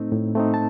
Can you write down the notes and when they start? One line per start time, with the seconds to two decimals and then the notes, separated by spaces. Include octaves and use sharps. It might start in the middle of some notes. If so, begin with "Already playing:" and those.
Already playing: A2 A3 C4 D#4
0.12 A2
0.35 A3 C4 D#4
0.54 A5